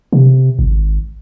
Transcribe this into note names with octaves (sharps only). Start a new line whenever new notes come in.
C3
G#1